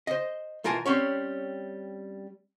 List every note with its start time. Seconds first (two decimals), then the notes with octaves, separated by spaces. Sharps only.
0.07 C5 D#5
0.64 B1 E3 F4 A#4 G#5 A5
0.86 G3 C4 C#4 C#5